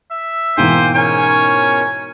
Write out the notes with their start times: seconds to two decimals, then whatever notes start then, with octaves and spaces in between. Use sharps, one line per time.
0.11 E5
0.58 G#2 B2 E3 A#3 C5 G5 G#5
0.94 C#4 A#4 C#5 G#5